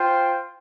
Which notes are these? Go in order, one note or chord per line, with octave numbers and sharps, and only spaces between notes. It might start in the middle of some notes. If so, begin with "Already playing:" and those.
Already playing: F4 C5 G5